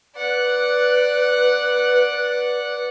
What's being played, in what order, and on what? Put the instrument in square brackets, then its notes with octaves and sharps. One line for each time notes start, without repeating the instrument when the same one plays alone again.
[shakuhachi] B4 [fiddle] D5 F#5